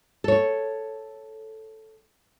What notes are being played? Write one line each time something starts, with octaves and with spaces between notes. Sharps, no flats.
A4 C#5